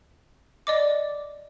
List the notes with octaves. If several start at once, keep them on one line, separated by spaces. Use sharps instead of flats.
D5 D#5 D6